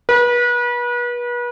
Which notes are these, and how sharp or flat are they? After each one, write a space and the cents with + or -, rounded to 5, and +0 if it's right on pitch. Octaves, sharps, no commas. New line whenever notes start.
B4 -35